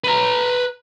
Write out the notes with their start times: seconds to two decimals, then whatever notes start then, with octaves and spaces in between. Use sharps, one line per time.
0.04 B4 A#5